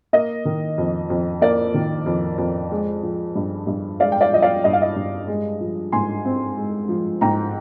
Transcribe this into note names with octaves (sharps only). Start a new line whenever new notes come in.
A#3 D#5
D#3
F2
F2
A#3 D5
D#3
F2
F2
G#3
F3
G2
G2
G#3 D5 F5
G5
D5 F5
F3 D#5
D5 F5
G2 D#5
F5
D#5
G2
G#3
F3
G#2 G#5 C6
C4
G#3
F3
G#2 G5 A#5